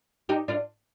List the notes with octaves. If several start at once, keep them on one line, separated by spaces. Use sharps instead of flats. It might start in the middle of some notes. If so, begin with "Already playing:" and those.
D#4 G4
D4 F4